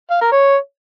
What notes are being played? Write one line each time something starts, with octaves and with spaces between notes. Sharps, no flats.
F5
A#4
C#5